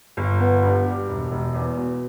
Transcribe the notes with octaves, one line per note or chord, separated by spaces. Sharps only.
G1
B3
G2
G3
E1
E1
E2
B2